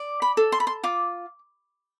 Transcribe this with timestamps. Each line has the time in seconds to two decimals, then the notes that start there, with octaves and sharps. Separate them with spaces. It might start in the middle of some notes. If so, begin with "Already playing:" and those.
Already playing: D5
0.22 B5
0.37 A4
0.52 C6
0.60 B5
0.67 C6
0.83 F4 D6